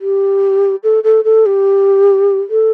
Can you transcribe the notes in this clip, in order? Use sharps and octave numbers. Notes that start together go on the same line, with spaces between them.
G4
A4
A4
A4
G4
A4